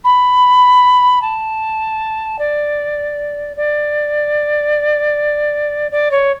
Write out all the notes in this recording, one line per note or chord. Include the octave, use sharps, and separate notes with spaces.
B5
A5
D5
D5
D5
C#5